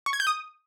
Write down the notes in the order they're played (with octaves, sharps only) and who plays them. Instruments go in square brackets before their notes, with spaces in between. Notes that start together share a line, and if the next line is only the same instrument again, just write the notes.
[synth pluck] C#6
G#6
G6
D#6